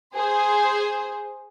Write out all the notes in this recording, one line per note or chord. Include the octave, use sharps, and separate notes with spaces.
G#4 C5